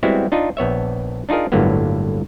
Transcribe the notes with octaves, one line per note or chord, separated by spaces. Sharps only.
G3 G#3 B3 C4 E4 F#4
D4 D#4 F4 D#5
A#1 B3 C#5 E5
D4 D#4 F4 G#4 A#4
G1 A2 D3 F#3 A#3 B3